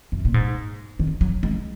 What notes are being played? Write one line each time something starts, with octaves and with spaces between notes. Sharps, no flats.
F#2
A#2
G#2
D#3
F#3
G#3